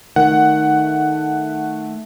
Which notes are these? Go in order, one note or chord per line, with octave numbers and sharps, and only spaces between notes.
D#3 A3 F#5